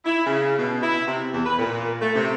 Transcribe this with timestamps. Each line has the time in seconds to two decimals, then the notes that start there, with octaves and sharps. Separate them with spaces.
0.05 E4
0.26 C#3
0.59 B2
0.83 E4
1.07 C3
1.33 E2
1.45 B4
1.58 A#2
2.01 A3
2.15 C3